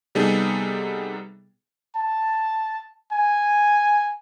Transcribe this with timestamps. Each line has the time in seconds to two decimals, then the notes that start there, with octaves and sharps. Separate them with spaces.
0.15 C3 G3 B3 D#4 G#4 A4
1.95 A5
3.12 G#5